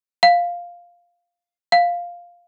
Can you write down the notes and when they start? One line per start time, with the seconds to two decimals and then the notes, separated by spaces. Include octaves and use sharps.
0.23 F5
1.72 F5